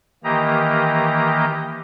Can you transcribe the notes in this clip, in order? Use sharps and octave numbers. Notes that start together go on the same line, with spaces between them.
D#3 E3 A#3 G4 D#5 A#5